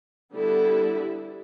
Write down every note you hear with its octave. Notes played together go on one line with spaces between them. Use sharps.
D3 G3 B3 E4 A4